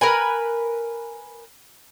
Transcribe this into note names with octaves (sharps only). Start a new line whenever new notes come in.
A#4 B4 G#5